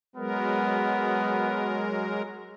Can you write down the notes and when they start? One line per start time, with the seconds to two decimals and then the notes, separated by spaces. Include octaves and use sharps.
0.16 F#3 G#3 B3 A#4